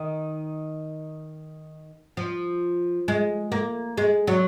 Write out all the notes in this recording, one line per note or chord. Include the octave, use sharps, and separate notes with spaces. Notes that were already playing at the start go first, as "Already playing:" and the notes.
Already playing: D#3
F3
G#3
A#3
G#3
F#3